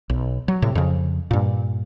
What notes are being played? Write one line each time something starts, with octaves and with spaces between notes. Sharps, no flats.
B1
F#3
A2 C3
F2 C#3
G2 A#2